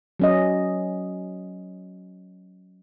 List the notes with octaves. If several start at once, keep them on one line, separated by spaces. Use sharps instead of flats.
F#3 C#4 D#5